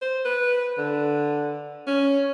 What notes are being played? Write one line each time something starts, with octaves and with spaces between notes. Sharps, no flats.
C5
B4
D3
C#4